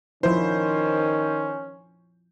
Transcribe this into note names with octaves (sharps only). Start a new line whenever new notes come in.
D#3 F3 C#4 E4 C5